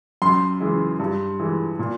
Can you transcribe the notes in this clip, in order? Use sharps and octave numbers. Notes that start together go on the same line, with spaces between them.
F#2 C6
C#3 E3 G#3
G2
E3 G#3
A#2